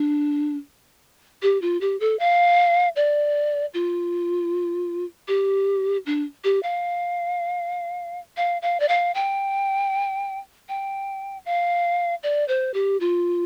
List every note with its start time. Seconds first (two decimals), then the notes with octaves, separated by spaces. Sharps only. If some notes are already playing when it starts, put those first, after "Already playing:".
Already playing: D4
1.42 G4
1.62 F4
1.81 G4
2.00 A4
2.19 F5
2.96 D5
3.74 F4
5.28 G4
6.06 D4
6.44 G4
6.63 F5
8.37 F5
8.62 F5
8.80 D5
8.88 F5
9.15 G5
10.69 G5
11.45 F5
12.23 D5
12.48 C5
12.74 G4
13.00 F4